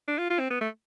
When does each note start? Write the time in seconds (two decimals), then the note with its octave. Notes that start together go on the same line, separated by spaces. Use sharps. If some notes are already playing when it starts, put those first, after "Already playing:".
0.08 D4
0.18 F4
0.30 F4
0.39 C4
0.51 B3
0.61 A3